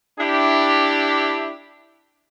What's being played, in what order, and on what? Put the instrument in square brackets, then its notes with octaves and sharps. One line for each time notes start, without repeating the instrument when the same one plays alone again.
[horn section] D4 E4 G4